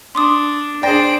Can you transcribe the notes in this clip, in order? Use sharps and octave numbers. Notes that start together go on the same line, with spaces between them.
D4 C6 D6 D#6
D4 G#4 C5 D5 G5 A6 A#6 D7